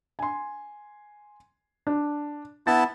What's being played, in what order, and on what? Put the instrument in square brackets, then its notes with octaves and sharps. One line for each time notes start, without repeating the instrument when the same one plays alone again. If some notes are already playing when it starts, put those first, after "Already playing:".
[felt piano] G#5 C6
D4
[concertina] B3 E4 A5 [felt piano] A6